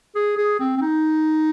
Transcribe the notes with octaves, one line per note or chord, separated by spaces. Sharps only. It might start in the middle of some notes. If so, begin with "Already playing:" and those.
G#4
G#4
C4
C4
D#4